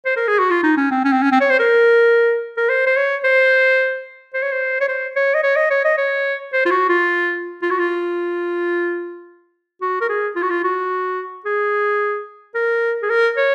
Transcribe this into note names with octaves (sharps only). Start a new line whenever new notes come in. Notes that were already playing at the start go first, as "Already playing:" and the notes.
C5
A#4
G#4
F#4
F4
D#4
C#4
C4
C#4
C4
C#4
C4
C#5
C5
A#4
A#4
C5
C5
C#5
C5
C5
C#5
C5
C#5
C5
C#5
D#5
C#5
D#5
C#5
D#5
C#5
C5
F4
F#4
F4
F4
F#4
F4
F#4
A#4
G#4
F4
F#4
F4
F#4
G#4
A#4
G#4
A#4
C#5